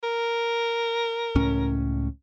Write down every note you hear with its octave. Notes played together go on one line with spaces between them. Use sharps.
A#4
C#2 A2 C#4